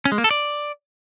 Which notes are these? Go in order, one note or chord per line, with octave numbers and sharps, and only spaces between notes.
C#4
G#3
A#3
A4
D5